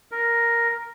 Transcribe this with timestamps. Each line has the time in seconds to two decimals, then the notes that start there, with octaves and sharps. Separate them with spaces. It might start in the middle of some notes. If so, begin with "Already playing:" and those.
0.12 A#4